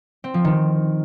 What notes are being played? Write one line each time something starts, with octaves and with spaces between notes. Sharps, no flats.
C4
F3
D#3